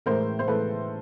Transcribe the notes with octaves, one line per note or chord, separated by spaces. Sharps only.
A2 E3 G#3 A#4 C5
C5
A2 E3 G#3 A4 B4